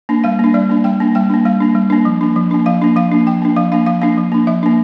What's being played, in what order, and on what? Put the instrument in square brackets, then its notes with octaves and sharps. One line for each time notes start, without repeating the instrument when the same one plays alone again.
[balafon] A#3 D4
G3 F5
A#3 D4
G3 D5
A#3 D4
G3 G5
A#3 D4
G3 G5
A#3 D4
G3 F5
A#3 D4
G3
A#3 D4
F3
A#3 D4
F3
A#3 D4
F3 F5
A#3 D4
F3 F5
A#3 D4
F3 G5
A#3 D4
F3 F5
A#3 D4 F5
F3 F5
A#3 D4 F5
F3
A#3 D4
F3 E5
A#3 D4